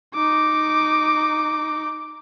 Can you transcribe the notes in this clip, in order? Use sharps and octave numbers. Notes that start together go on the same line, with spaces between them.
D#4 D6